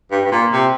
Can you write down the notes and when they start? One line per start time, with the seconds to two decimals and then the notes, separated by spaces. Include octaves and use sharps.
0.11 G2
0.25 G2
0.31 A#2
0.52 C3